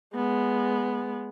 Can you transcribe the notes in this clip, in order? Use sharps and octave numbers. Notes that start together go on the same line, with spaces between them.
G#3 B3